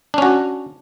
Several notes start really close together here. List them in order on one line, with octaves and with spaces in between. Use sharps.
D4 C#4 F#4